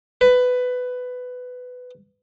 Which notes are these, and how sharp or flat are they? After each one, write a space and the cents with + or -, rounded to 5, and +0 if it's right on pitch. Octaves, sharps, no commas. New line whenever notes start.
B4 +15